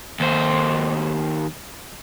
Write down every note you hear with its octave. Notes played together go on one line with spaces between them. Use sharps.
D#2 C5